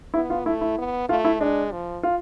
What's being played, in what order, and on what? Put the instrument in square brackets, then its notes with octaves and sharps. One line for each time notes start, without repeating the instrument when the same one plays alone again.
[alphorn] B3 [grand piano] E4
[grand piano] F4
[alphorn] A3 [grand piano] E4
[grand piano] E4
[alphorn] B3
[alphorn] A3 [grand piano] F4
[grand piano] E4
[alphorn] G#3 [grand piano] D4
[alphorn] F3
[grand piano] F4